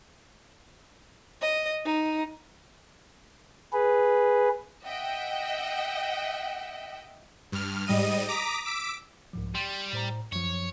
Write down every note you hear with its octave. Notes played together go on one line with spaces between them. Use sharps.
D#5
D#4
G#4 B4
D#5 E5 F#5 G5
G2 F6
G#2 G3 D#5 D#7
A#5 D6 D#6 B6
D6 E6 B6 D7
C2 G#2 F3
G3 C6 A6
A2 C5 A#5
F#2 F3 C#5